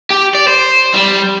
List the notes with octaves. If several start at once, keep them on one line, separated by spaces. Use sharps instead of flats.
G4
D5
C5
G3